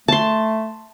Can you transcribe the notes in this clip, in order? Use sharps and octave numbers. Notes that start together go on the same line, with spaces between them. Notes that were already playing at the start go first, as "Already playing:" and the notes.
A3 A5 C6